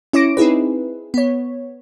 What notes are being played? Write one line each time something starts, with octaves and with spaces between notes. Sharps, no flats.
C#4 E4 C#5 D6 A#6 D7
C4 D#4 E4 G#4 B4
B3 C#5